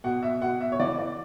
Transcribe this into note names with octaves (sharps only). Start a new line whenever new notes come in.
B2 F#5
E5
B2 F#5
E5
C#5
E3 D5
D5